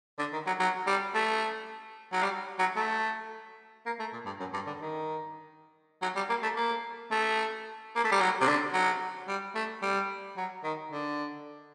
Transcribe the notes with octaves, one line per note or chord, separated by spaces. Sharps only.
D3
D#3
F#3
F#3
G3
A3
F#3
G3
F#3
A3
A#3
A3
A#2
G2
F#2
G2
D3
D#3
F#3
G3
A#3
A3
A#3
A3
A#3
A3
G3
F#3
C3
D3
F#3
G3
A3
G3
F#3
D#3
D3